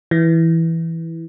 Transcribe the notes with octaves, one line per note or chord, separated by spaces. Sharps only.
E3